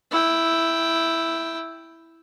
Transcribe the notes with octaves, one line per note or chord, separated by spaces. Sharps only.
E4 G5